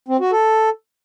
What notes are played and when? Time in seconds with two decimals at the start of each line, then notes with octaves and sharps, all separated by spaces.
0.08 C4
0.20 F#4
0.32 A4